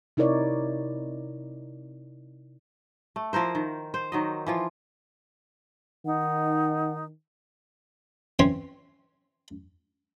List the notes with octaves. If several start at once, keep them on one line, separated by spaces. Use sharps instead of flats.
C3 D#4 E4 A#4 C#5 D5
A3
F3 E4 A#4 C5
D#3
C5
D#3 F#3 D#5
E3 F3 F4
D#3 D#4 F#5
E3 C4 C#4 C#5 C6